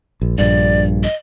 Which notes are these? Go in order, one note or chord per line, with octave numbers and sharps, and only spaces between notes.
A#1
A#1 G2 D5
D#5